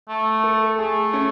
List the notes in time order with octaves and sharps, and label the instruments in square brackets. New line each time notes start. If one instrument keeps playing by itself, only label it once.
[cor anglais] A3
[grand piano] A4
[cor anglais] A3 [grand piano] G#4
[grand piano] C#4